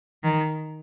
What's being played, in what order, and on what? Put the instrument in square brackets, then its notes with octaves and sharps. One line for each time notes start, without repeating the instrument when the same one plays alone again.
[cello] D#3